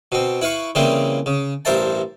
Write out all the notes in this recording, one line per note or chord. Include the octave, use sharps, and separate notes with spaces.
B2 C4
E4 B4 F5 C#6
C#3 E3 G3 A#3 C4
C#3
A1 G2 A#4 C5 E5 A5